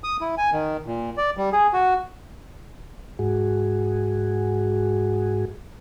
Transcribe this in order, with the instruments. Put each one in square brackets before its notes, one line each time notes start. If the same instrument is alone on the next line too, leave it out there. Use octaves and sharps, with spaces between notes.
[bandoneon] D#6
E4
G#5
D#3
A#2
D5
G3
G#4
F#4
[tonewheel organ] G#2 F#4 G#4